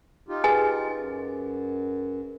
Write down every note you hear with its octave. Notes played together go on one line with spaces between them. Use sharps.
D#4 F4 G4
G#4 B4 G#5 A6
F#2